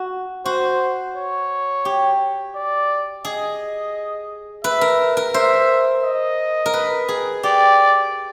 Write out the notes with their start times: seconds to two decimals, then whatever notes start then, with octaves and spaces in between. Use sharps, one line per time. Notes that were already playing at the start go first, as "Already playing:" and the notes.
Already playing: F#4
0.45 F#4 C5
1.16 C#5
1.85 G4
2.55 D5
3.25 G#4 D#5
4.64 B4 E5
4.81 A#4
5.17 A#4
5.34 C5 E5
6.04 D#5
6.66 A#4
6.74 B4
7.09 G#4
7.43 G4 D5